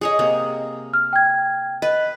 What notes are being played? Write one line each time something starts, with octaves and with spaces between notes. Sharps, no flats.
G#4 C#5 D#5
C3 A#3
F6
G5 G#6
B4 D#5